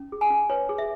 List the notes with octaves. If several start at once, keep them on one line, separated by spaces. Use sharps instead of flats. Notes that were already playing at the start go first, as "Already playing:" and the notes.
Already playing: C#4
G#4
G#5
C#4
B4 C#5
G#4
E5